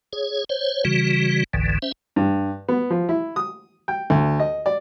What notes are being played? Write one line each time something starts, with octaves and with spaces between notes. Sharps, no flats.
G#4 C#5
C5 C#5
C#3 E3 G3 F#4
G1 C#2 G#2 D3 E3
C#4 C5 E5
G2
B3
F3
E4
D#6
G5
D2
D#5
D5